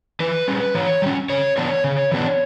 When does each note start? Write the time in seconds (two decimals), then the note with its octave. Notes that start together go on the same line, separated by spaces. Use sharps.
0.20 E3 B4
0.48 G3 C#4
0.75 E3 C#5
1.02 G3 C#4
1.30 C#3 C#5
1.57 E3 B3 D4 C#5
1.84 C#3
2.12 E3 B3 D4